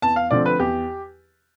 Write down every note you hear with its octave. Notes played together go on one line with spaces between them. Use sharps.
E2 A5
F5
D3 F3 A3 C4 D5
B4
E2 G4